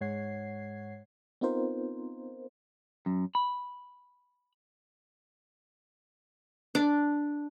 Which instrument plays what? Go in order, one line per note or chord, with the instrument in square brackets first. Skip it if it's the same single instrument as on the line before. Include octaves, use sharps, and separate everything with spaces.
[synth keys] G#2 G#3 C#5 F#5 G#6 C7
[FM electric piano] B3 C4 D#4 F4 A#4 C5
[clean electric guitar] F#2
B5
[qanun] D4